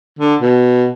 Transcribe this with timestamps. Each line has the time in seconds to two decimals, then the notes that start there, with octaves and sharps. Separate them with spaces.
0.19 D3
0.41 B2